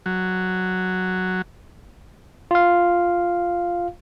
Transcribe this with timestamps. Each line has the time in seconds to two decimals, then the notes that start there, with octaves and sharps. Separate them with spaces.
0.06 F#3
2.51 F4 F5